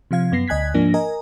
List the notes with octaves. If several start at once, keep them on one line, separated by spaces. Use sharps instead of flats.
C3 F3 F5 G#6
F#2 B3 A#6 C7
D2 D#5 G#5 F#6 G#6 B6
G#2 F3 A#3 D4 A#6
A#4 D#5 G#5 A#5